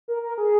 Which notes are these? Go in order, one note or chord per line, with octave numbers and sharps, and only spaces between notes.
A#4
A#4
G#4